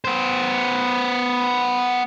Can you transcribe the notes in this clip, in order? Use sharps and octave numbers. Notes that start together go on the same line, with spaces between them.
B3 C5